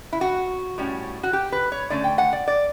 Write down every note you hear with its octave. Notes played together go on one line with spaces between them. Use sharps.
E4
F#4
A2 G3 C#4
F#4
G4
B4
C#5
D3 A3 C#4 D5
G5
F#5
D5
D5